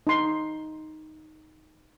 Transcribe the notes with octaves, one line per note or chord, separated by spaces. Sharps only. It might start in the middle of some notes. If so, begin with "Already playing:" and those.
D#4 C6